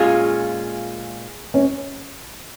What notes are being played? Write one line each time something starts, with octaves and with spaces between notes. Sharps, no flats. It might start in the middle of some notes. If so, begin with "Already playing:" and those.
Already playing: A#2 G#3 C#4 F4 G#4
C#4